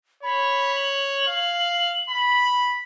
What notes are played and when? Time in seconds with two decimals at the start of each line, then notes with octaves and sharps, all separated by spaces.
0.23 C#5 B5
0.76 F#7
1.28 F5
2.10 B5